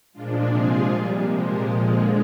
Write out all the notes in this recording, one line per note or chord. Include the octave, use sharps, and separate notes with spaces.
A#2 F3 G#3 D4 F4
C3 F3 G#3 F4 G#4
A#2 G3
C3 F3 G#3
A#2 F3 G#3 G4 A#4
D3 F3 G#3 F4 G#4